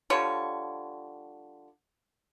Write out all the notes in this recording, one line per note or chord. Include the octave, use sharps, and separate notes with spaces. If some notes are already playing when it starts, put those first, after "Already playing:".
D3 F3 G3 C#5